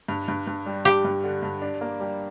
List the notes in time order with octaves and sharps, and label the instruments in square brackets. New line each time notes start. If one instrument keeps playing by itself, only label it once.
[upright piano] G2
G2
G2
G3
[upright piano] G2 [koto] G4
[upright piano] G2
D3
G2
D4
A#3
G3